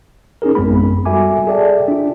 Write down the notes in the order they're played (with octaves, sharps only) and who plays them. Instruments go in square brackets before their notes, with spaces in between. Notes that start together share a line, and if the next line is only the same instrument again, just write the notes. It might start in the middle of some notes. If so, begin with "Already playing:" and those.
[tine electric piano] C#4 D#4 G#4 A#4
A1 F#2 G#3 B3 C4 B5
G3 F#4 A4 E5 G#5 D6
G#4 A4 D5 E5 G5 A5
D4 F4